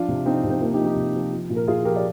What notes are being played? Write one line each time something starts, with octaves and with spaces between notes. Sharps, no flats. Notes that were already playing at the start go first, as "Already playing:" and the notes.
Already playing: F3 D4 F4
C3
F3 C4 D#4
C3
C4
F3 A#3
D#4 G4
F3
D#4 G4
C3
F3
F3
A#2
A#4
A#2 F4 G#4
F3 G4 A#4
D5